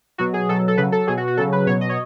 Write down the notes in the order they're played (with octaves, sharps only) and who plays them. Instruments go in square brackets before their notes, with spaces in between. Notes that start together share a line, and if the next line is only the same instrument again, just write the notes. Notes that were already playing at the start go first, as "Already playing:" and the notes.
[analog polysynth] B2 F#3 F#4
G#4
B2 F#3 A4
A4
C#3 F#3 B4
A4
B2 F#3 G#4
F#4
F#4
C#3 F#3 A4
B4
B2 F#3 C#5
D#5
C#5